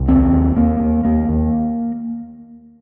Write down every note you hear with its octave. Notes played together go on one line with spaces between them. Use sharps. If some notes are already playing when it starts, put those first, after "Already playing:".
Already playing: C2
D#2 C4
D#2
D#2 A#3
D#2
D#2 A#3
D#2